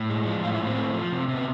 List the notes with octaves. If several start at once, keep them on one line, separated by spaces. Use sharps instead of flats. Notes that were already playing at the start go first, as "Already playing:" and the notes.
Already playing: A2
G#3
F3
A2 F4
E4
A2
C4
A3
F3
C3
C3
B3